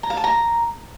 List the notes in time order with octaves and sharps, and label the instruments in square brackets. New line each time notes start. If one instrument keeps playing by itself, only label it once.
[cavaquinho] A#5
F5
A5
A#5